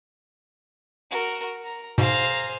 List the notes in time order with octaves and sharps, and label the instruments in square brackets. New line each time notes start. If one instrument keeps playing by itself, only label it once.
[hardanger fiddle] F#4 A#4
A#5
[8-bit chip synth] G#2 B2 [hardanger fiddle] G#4 C5 [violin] F5 A#5